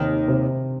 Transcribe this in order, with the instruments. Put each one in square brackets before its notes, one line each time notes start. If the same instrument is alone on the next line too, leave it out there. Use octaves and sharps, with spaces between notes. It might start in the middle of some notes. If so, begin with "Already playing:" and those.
Already playing: [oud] D#2 D#3 [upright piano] C3
[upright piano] C3